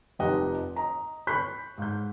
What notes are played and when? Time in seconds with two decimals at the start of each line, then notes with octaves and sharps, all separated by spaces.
0.19 F1 F3 D#4 G4 D#5 F#5
0.76 D#5 A#5
1.27 B5 C#6 F#6 G6 B6 C7
1.78 G#2 G6